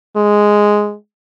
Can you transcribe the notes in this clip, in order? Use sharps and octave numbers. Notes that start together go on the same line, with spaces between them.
G#3